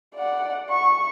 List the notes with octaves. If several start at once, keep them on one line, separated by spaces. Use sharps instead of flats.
D5 F#5
C#6